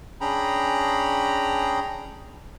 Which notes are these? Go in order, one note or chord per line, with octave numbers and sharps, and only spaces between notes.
C#4 D4 G#4 G5 A#5 B5